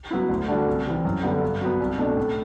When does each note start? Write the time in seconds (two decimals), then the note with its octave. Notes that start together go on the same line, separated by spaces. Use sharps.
0.11 F#3 B3 E4
0.29 D2
0.48 D3 G3 D4 F#4
0.67 C2
0.86 C3 E3
1.05 F#2
1.23 D3 G3 B3
1.42 G2
1.61 F#3 B3
1.80 C2
1.98 B2 A3 D4
2.17 A2